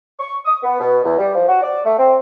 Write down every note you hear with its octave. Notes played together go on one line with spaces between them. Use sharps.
C#6
D#6
B3
B2
E2
G3
F3
F#4
D5
A3
C4